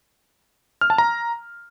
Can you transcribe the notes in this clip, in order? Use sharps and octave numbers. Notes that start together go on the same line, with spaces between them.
F6
A5
A#5